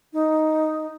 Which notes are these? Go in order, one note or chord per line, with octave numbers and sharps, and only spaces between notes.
D#4